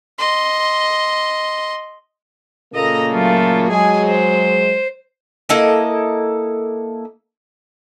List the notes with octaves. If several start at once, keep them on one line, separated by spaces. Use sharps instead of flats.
D#5 C6
A#2 C#3 A#3 A4 D#5 A#5
F#3 A3 F4
F#3 G#3 G#4 G#5
C5
A#3 E4 A4 D#5